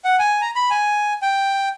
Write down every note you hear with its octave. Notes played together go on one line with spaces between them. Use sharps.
F#5
G#5
A#5
B5
G#5
G5